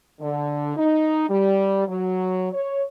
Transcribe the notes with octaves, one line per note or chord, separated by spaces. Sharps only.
D3
D#4
G3
F#3
C#5